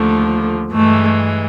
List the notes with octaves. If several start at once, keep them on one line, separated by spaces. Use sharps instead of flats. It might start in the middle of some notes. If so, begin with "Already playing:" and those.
Already playing: D#2 D3 F3 A3
G2 E3 G#3 A3